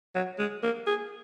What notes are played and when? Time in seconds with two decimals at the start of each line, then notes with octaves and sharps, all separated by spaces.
0.15 F#3
0.39 G#3
0.63 A#3
0.87 G#4